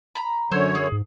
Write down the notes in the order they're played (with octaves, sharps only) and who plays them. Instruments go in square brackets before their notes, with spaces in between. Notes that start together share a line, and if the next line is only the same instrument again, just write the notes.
[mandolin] A#5 B5
[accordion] F#2 D3 C#5 [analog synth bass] F#3 [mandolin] C5 E6
[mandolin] G#4
[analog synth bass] G#2